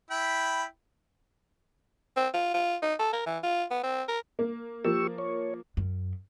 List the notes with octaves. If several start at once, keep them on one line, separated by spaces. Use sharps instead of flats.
E4 G5 B5
C4
F4
F4
D#4
A4
A#4
E3
F4
B3
C4
A#4
A#3
F3 A#3 G4 C#6 E6
C#5
F#2